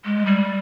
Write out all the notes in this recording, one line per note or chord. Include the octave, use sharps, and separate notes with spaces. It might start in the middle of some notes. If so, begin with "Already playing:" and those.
G#3
G3